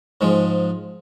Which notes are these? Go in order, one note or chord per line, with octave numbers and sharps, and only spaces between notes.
G#2 F3 G#3